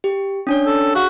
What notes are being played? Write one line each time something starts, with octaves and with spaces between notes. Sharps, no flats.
G4
C#4 D4 C#5
A4
F#4 G#4 F5 F#6